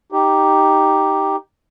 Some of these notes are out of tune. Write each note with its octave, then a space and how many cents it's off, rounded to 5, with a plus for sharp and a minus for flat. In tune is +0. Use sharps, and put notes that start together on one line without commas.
D#4 +0 G4 +0